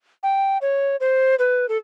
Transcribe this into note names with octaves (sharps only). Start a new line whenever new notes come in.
G5
C#5
C5
B4
A4